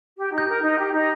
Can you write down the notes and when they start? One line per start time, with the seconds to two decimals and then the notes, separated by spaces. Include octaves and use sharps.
0.17 G4
0.32 D#4
0.38 G6
0.47 A#4
0.62 D#4
0.78 G4
0.93 D#4